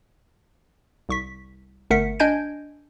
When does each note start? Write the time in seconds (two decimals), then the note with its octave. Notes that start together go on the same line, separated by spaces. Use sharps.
1.09 C2 C#6 B6
1.90 G1 A3 A#4 F#5 B6 C#7
2.20 D4 D#5 G#5 G6 G#6 D7